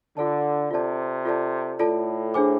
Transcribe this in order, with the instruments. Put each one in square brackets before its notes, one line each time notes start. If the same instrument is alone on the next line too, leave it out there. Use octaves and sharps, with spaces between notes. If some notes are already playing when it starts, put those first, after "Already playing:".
[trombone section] D3 [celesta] F4 A4 D5 A5
[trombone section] C3 [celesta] F4 A4 D5 A5
[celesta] F4 A4 D5 A5
[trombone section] A2 [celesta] F4 A4 D5 A5
[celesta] D4 G#4 C5 G#5 D6